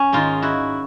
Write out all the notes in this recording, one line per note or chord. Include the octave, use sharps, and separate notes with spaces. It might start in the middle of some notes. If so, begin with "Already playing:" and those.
Already playing: C#4
G#2 D#3 G#3 D#4 F4
E4 F#4